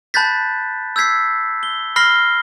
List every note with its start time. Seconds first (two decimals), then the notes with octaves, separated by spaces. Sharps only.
0.14 A5 B5 F#6 G6 A6 B6
0.96 E6 G6 G#6 B6 C7
1.63 G7
1.96 B5 F6 A#6 C7 G7